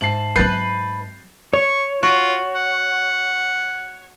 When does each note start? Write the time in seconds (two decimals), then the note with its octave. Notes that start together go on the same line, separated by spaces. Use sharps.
0.01 G#2 E5 A5 C7 F#7
0.36 F#3 C4 B4 G6 A6 C7
1.53 C#5 C#6
2.03 F4 F#4
2.55 F#5